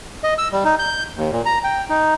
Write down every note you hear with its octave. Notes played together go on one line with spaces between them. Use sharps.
D#5
E6
G3
D#4
G6
D#2
A#2
A#5
G5
D#4